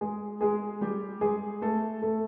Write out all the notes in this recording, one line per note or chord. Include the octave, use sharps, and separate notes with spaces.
G#3 G#4
G#3 G#4
G3 G4
G#3 G#4
A3 A4
A3 A4